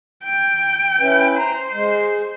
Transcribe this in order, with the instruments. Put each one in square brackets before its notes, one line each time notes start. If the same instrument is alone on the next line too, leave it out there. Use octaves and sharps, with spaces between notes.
[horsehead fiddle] G5
[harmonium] C#4 E4 B4
[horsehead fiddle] C5 [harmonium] A#5
[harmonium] G#3